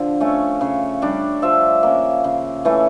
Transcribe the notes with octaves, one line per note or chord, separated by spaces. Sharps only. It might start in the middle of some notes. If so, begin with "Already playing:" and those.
Already playing: D3 F3
A3 C#4
C#3 C#5
G3 D4
F3 E5
A#3 C#4
C#3
E3 A3 C#4